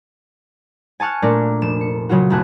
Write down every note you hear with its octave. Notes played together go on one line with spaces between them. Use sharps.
G#5 A5 C#6 F6 F#6
A#2 A3 D4 A#4
F1 E7
C#7
C#3 F#3 F4 F#4
F#1 B1 A3 G#5 F#6